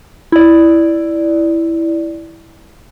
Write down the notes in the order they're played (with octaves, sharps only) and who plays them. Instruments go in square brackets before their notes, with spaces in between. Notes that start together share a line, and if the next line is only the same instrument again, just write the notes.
[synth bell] E4 D5